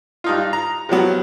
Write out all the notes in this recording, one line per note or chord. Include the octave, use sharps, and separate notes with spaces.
G2 D#4 F4
A#5
C3 F3 F#3 B3